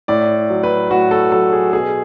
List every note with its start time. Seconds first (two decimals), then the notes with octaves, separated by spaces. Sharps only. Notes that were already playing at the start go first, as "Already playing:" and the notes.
0.08 A2 D5
0.50 F#3
0.63 B4
0.90 A2 F#4
1.11 A4
1.32 F#3 A4
1.53 G#4
1.73 B2 G#4